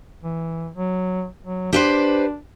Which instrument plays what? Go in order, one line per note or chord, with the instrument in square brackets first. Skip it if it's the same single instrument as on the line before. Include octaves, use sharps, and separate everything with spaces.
[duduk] E3
F#3
F#3
[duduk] D4 [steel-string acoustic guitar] G4 B4 C5